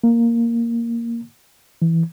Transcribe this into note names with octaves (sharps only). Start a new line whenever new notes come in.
A#3
E3